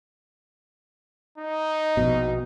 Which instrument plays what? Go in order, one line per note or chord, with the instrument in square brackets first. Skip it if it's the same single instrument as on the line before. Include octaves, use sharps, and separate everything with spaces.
[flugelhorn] D#4
[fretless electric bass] A#1 B2